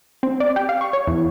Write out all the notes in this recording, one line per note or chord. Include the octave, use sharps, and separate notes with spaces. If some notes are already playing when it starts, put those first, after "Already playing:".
C4
D5
G4
F5
C#6
C#5
E2